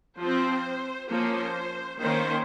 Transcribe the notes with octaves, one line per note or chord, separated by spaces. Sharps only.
F3 C4 C5
F3 A#3 C#4 C5
D#3 A#3 C#4 C5